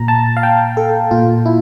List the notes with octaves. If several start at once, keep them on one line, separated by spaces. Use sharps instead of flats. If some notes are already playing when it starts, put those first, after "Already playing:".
Already playing: A#2 A#5
A5
F5
G5
A4
A#2 F4
E4